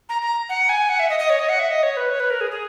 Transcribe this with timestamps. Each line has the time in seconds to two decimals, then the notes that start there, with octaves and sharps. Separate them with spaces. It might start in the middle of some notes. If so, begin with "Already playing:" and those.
0.09 A#5
0.22 A#5
0.49 F#5
0.69 G#5
0.89 F#5
1.00 E5
1.09 D#5
1.19 D#5
1.30 C#5
1.39 D#5
1.49 F#5
1.60 E5
1.71 D#5
1.83 C#5
1.97 B4
2.10 C#5
2.20 B4
2.30 A#4
2.41 G#4
2.51 G#4